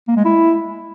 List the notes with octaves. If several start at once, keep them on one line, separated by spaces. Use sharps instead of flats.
A#3
G#3
E4